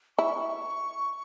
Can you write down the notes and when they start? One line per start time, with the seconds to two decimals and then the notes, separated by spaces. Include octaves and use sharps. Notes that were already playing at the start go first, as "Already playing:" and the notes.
0.18 E4 C#6